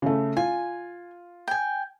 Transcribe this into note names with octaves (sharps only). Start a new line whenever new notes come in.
C#3 A3
F4 G#5
G5 G#5